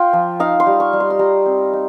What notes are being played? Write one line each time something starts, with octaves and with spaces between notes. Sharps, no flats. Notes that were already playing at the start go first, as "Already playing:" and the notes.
Already playing: F4 G5
F3
D#4 F5
C6
G3
C#6
G3
C6
C6
G3 A#5
C4
D#4